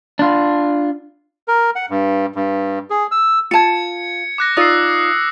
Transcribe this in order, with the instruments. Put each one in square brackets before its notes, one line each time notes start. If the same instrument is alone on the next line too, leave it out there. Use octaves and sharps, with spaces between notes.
[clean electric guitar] D4 F4
[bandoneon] A#4
F#5
G2
G2
G#4
E6
[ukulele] F4 A5 [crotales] G#6 C#7
[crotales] D6 F#6 A#6
[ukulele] D#4 F4 D5 [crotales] D#6 E6 C7